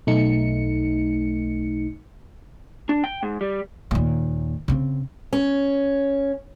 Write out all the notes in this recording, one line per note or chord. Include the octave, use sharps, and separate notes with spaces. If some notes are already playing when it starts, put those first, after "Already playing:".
B1 A3 D#4 C#7
D4
G5
G#2
G3
D#2 A#2
C#3 C4
C#4